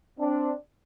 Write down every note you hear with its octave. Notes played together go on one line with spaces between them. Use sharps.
C4 D4